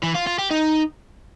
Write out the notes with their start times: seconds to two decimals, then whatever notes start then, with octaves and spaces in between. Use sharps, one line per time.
0.03 E3
0.15 F4
0.27 F4
0.39 G4
0.50 D#4